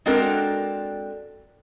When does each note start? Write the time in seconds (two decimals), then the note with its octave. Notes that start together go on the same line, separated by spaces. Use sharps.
0.06 G#3 C4 D4 F#4 A4 A#4